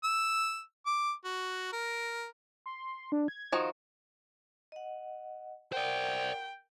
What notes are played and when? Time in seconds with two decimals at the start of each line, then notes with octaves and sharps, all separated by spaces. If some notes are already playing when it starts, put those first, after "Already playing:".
0.04 E6
0.86 D6
1.24 F#4
1.72 A#4
2.66 C6
3.12 D4
3.28 G#6
3.52 D#3 F3 F#4
4.72 D#5 F#5
5.72 A#4 C5 D5 F#5 G5